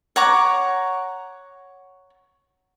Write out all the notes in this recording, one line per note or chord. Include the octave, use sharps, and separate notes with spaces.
C#5 F#5 A#5 D6